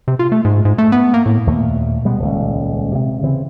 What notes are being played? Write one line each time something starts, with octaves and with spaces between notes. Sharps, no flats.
C3
F4
A3
G#2
G#2
A3
B3
A#3
A2
D#2 A#2 A3
B2 G3 G#3 B3
D#1 C#2
C3
C#3 E3 C4